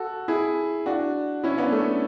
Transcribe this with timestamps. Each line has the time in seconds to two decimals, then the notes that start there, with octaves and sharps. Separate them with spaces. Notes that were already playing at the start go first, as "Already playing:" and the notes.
Already playing: F#4 A4
0.28 E4 G#4
0.86 D4 F#4
1.44 C#4 E4
1.58 B3 D4
1.72 A3 C#4